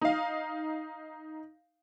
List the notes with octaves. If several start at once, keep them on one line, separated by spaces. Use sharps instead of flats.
D#4 F5